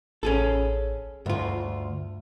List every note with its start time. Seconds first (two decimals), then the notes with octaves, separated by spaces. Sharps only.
0.23 A1 C#4 G#4 A4
1.26 D2 G2 F4